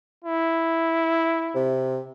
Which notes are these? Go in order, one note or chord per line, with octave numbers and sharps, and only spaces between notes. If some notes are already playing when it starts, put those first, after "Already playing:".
E4
C3